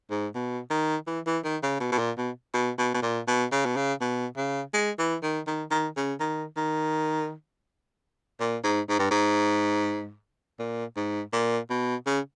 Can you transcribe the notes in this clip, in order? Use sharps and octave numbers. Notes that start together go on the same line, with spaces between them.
G#2
B2
D#3
E3
E3
D#3
C#3
B2
B2
A#2
B2
B2
B2
B2
A#2
B2
C#3
B2
C#3
B2
C#3
G#3
E3
D#3
D#3
D#3
C#3
D#3
D#3
A#2
G#2
G#2
G2
G#2
A#2
G#2
A#2
B2
C#3